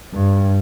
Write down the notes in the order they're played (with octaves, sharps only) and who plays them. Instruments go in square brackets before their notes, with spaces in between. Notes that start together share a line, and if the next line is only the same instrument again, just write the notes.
[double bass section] G2